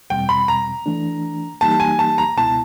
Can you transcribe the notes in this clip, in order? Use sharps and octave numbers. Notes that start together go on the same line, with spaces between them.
E2 B2 G3 C4 G5
B5
A#5
E3 A3 D4
E3 G3 A#3 D#4 G4 A5
G#5
A5
A#5
C#2 B2 G#3 B3 E4 A5